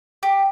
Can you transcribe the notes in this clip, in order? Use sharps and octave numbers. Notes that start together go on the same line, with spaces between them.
G4